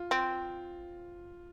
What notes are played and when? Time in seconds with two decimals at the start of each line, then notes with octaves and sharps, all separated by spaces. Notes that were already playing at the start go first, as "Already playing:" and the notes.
Already playing: F4
0.11 C4